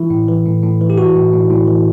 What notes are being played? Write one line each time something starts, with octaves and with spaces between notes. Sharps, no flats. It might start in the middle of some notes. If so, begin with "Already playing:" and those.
Already playing: E3 E4
A2
E3
A2
A2
E3
G4
E3 F#4
A2
A2
A2
E3